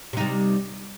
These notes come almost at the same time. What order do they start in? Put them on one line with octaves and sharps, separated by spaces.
C3 D#4 G3